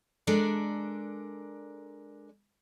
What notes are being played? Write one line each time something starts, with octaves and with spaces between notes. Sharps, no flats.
G#3 D4 A4 A#4 D5